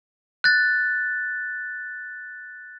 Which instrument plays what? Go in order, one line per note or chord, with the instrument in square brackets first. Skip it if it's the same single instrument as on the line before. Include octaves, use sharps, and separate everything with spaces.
[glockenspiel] F#6 A6